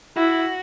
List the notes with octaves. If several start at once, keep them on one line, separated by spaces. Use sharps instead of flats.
E4 F#4